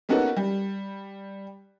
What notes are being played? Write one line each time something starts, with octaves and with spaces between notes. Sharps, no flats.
A#3 B3 C#4 D#4 F#4 A4
G3